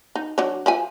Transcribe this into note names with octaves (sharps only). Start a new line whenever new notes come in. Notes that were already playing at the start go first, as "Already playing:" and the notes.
D#4
F#3 D4 C#5
F3 E5 G#5